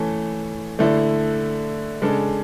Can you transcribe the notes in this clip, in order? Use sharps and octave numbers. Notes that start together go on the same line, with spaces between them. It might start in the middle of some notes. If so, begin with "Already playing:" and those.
Already playing: E3 A3 C#4 A4
D3 A3 E4 A4
C#3 G#3 D4 A4